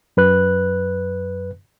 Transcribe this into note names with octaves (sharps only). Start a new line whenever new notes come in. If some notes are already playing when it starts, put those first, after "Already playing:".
F#2 B4 F#6